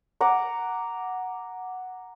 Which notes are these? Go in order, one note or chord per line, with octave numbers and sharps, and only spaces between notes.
F#5 A#5 D6